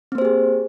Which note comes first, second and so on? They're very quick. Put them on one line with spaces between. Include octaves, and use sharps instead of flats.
C4 A#3 C5 G4 G#4